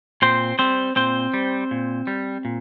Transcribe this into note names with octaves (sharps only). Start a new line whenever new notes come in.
A#2 C4 C5
G3 C4 C5
A#2 C4 C5
G3
A#2
G3
A#2